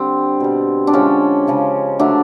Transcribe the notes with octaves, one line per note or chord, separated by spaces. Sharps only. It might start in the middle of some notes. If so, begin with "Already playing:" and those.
Already playing: D3 G3 C4
B2 G3
D4
D3 F3 G#3 C#4
C#3 F3 G#3
D3 F#3 A3 D4